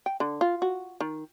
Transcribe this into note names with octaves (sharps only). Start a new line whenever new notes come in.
G5
D3
F4
F#4
D#3